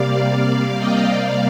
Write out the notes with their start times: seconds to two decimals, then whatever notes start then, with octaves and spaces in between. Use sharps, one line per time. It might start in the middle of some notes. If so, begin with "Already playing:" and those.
Already playing: C3 G3 A#3 D5 F5
0.46 D5 F5
0.78 D#5 G5
1.09 C3 G3 A#3 D5 F5